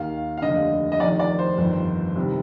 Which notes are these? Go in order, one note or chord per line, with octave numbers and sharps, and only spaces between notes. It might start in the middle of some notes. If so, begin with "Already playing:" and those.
Already playing: D#2 D#3 F5
F5
F1 D#2 D3 D#5
D#5
F1 F2 D#3 D5
D5
C5
G1 F2 D#3
C2 C3 D#3